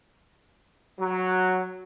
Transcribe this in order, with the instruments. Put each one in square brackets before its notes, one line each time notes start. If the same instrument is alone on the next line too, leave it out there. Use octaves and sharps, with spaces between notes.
[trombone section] F#3